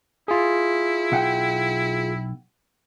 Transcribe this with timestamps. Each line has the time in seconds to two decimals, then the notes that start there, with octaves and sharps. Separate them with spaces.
0.28 E4 F4 G#4
1.12 B1 F#5 G5